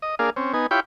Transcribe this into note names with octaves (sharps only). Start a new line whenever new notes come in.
D#5
A#3 D4 G#4 F5
C4 C#4
B3 D#4 G#5
E4 F4 G4 C#5 G5 B5